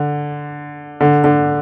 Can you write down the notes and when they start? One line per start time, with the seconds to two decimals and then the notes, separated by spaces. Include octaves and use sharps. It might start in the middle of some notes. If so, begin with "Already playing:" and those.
Already playing: D3
1.01 D3
1.24 D3